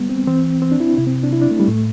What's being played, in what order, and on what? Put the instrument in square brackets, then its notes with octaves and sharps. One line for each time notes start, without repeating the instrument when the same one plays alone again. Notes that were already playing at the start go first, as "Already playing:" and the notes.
Already playing: [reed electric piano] G3 B3
C4
[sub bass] E3 [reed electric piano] C4
[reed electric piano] C4
D4
E4
[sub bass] C3 [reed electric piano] E4
[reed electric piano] C4
D4
E4
D4
A3
G3
[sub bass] A2 [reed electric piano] A3